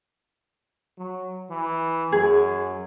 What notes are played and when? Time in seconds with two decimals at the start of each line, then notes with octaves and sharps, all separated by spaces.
0.98 F#3
1.50 E3
2.12 F#2 G#4